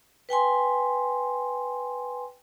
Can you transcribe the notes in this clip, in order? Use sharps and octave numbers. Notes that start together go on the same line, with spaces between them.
B4 G5 G#5 C6